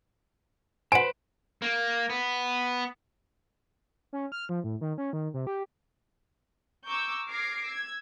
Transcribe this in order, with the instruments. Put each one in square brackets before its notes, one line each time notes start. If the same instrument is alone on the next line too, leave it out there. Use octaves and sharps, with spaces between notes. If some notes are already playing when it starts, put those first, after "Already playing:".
[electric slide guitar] B4 C5 [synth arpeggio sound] F#5 G#5 [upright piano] D7
[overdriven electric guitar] A#3
B3
[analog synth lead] C#4
F6
F3
A2
D#3
C#4
D#3
C3
G4
[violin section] A#5 C#6 D6 E6 G6
D6 F6 G#6 A#6 C7 D7
E6 G#6